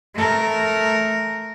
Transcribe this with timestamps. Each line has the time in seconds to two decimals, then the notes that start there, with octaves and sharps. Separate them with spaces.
0.15 A3 A#4